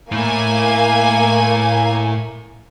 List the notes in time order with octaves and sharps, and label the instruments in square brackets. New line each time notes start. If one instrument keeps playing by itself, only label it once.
[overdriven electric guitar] A2 E4 [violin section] A#3 G#5